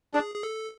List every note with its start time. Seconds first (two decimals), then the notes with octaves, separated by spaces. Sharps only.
0.14 D4 G#4
0.35 G#4
0.43 A4